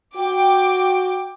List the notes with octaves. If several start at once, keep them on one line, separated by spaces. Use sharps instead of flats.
F#4 G5 D6